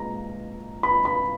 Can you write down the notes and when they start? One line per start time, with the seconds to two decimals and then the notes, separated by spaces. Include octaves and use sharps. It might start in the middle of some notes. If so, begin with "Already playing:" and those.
Already playing: A#2 G#3 A#5
0.83 B5
1.05 B5